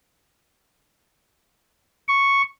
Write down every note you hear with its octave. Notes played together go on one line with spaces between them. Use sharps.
C#6